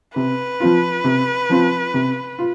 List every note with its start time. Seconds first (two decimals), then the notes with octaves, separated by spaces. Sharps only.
0.16 C3 B4
0.60 F3 C4 F4
1.04 C3
1.49 F3 C4 F4
1.94 C3
2.39 F4